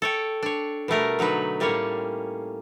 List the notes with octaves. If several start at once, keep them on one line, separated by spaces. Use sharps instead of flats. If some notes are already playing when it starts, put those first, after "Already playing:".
A4 C#5 G5
D4 C#5
B2 G3 A3 A#4
D3 F#3 D#4 B4
A2 G3 A#3 C#4 C#5